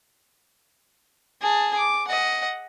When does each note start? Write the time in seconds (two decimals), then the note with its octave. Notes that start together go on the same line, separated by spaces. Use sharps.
1.42 G#4 A5
1.76 D6
2.08 D#5 F#5